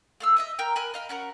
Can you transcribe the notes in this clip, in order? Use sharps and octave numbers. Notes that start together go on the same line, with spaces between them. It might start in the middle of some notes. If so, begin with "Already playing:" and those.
A3 F5 E6
D#5 E5 D#6
A#4 G5 A#5
A#4 G#5 B5 F#6
D#5 F5 B5
C#4 F#4 A#4